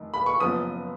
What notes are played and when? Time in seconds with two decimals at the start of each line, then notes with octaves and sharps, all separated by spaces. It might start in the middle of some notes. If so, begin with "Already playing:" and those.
Already playing: F1 D#3
0.14 B5
0.26 C#6
0.40 F#1 F#2 F3 B3 D#6